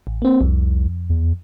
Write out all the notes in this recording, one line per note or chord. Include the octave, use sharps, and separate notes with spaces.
A1
A#3 C4
C2 F2
E2